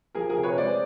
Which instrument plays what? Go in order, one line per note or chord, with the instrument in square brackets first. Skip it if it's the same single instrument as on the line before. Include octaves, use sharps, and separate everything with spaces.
[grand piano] F3 G#4 A#4
G#4 A#4
C3
B4 C#5
G#3 C5 D5